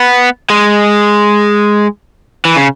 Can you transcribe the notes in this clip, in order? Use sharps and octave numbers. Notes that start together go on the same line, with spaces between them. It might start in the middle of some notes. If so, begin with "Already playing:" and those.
Already playing: B3
G#3
E3
C#3